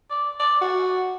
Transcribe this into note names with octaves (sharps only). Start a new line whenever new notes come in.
D5
D5
F#4